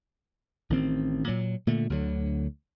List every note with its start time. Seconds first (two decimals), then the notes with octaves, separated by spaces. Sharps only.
0.70 A1 D#3 C4
1.28 A#2 F#3
1.67 A#2 D3 A3
1.90 D2 D3 D#3 F#3